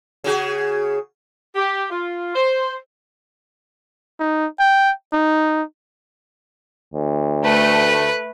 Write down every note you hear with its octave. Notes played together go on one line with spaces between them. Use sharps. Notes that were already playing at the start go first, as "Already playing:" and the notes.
C#3 F#4 G#4
G4
F4
C5
D#4
G5
D#4
D2
A3 B4